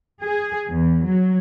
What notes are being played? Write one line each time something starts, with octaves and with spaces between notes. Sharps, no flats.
G#4
E2
F#3